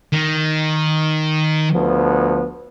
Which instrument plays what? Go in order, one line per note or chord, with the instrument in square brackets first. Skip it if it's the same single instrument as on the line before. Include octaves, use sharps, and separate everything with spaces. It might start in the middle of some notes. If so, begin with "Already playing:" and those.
[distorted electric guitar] D#3
[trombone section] D2 F3 B3